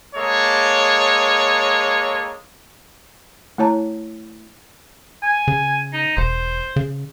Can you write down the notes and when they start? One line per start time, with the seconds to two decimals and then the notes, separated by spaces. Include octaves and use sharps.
0.15 G#3 A#3 A4 C#5
3.58 A3 E4 C#5 A5 A#5
5.23 G#5
5.48 C#3
5.93 D#4
6.17 E1 C5
6.76 C#3